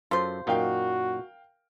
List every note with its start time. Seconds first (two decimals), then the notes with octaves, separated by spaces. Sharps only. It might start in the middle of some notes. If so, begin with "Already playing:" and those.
0.11 F#2 F4 A4 C5
0.47 F#2 A#2 D#4 F#4 A#4 F5 G5